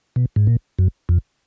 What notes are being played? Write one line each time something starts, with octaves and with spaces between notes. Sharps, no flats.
B2
G#2
A#2
F#2
F2